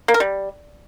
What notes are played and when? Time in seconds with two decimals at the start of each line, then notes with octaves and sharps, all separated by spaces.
0.08 A#3
0.14 A#4
0.20 G3